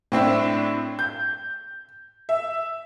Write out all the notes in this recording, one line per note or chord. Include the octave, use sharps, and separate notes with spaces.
A2 C4 D4 E4
G6
E5